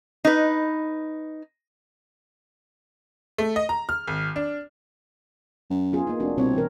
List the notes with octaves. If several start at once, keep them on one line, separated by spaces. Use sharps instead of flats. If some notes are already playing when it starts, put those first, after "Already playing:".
D#4 B4
A3
D#5
A#5
F6
G#1
D4
F#2
B3 F4 G#4
A#3 D#4
F1 D4 F#4
C2 B2 C4 C#5
E3 A#4